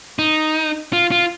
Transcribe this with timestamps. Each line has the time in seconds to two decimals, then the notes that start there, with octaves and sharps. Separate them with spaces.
0.19 D#4
0.93 F4
1.12 F4